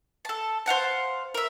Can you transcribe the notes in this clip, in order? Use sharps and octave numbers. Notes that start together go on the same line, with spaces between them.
A4 A5
C5 F5 F#5 A5
A#4 E5